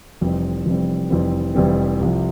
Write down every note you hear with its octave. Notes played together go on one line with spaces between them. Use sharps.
F1 F2 E3 G3 C4
F1 F2 E3 G3 C4
F1 F2 E3 G3 C4
F1 F2 E3 G3 C4
C2 C3 F3